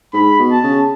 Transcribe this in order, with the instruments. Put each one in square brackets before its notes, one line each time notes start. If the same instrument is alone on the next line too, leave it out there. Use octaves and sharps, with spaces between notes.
[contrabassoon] G#2 [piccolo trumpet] B5
[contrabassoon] B2
[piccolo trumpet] A5
[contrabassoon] C#3